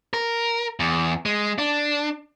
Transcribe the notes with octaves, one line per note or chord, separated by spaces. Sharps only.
A#4
E2
G#3
D4